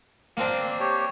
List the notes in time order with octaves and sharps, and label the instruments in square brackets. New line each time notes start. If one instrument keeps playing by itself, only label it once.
[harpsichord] A#3 C4 D4
[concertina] G4 C#5